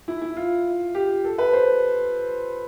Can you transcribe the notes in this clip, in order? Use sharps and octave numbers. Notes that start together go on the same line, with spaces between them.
E4
E4
F4
G4
A4
B4
C5